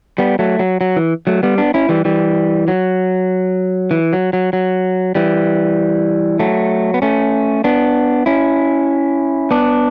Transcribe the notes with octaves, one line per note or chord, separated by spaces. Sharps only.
G3 B3
F#3 A3
F#3
F#3
E3
F#3 A3
G3 B3
B3 D4
C#4 E4
E3 G3
E3 G3
F#3
E3
F#3
F#3
F#3
E3 G3
F#3 A3
B3
A3 C#4
B3 D4
C#4 E4
B3 D4